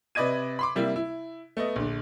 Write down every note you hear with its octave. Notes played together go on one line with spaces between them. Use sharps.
C3 B4 D5 D#5 G#6 D#7
B5 C6 D6
C3 G3 A#3 E4
E4
A3 B3 D#5
A#1 D3